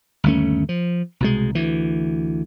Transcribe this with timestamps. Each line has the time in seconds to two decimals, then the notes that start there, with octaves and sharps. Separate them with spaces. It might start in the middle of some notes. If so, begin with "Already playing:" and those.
0.24 G1 D#2 A3 C#4
0.69 F3
1.20 C2 B2 G#3
1.55 D2 E3